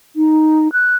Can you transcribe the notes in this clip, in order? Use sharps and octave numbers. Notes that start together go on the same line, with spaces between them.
D#4
F#6